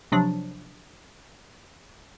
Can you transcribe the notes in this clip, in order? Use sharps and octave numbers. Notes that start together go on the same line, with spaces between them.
C3 F3 F#3 D4